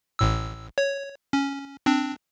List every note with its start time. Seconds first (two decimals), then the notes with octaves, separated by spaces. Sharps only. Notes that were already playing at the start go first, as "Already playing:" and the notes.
0.19 A1 A2 E6
0.78 C#5
1.33 C#4
1.86 C4 D4